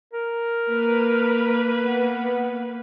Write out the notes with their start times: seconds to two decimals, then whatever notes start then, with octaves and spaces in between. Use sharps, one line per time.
0.13 A#4
0.66 A#3 B4
1.84 B3